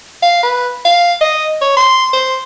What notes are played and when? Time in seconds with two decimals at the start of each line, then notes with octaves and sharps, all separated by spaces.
0.22 F5
0.43 B4
0.85 F5
1.21 D#5
1.61 C#5
1.77 C6
2.13 C5